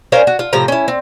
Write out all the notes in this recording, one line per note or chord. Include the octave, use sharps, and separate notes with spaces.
C#4 A#4 C5 F5
F#4
F4
A2 C3 F3 A#5
C#4 E4
C4